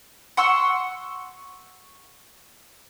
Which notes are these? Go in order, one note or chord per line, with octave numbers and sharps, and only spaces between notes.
F#5 C6 C#6 E6